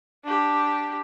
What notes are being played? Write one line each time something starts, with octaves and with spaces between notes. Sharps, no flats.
D4 G4